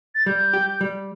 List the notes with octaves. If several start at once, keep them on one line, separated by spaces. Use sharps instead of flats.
A6
G3 G6
G4
G3